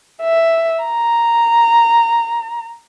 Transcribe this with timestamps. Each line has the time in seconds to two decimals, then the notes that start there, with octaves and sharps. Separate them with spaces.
0.22 E5
0.84 A#5